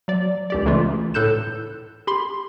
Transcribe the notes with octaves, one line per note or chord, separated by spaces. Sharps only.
F#3 D5
C#2 G4 D5
C#3 E3 G#3 A3 F4
A2 A4 F#6 G6 E7
G4 B5 C6